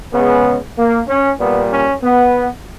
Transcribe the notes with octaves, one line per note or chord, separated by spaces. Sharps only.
C#3 G#3 B3
A#3
C#4
A#2 G3 B3
C#4
B3